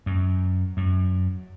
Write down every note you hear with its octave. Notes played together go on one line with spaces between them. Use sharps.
F#2
F#2